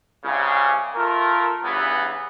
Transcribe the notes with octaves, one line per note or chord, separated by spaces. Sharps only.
C2 C#3
A3 F4 A#4
E2 G2 C#3 E3 B3